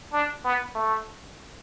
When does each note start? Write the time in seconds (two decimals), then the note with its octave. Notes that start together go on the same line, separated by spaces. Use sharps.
0.13 D4
0.45 B3
0.75 A3